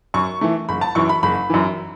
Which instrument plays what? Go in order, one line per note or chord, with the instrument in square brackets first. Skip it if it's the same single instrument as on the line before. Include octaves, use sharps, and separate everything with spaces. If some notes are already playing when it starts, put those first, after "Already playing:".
[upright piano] F#2 C#6
E3 A3
F#1 B5
A5
F#2 E3 C#6
B5
F#1 B5
F#2 E3